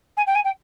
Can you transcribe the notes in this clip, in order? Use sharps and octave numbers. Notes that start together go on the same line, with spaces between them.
G#5
G5
G#5
G5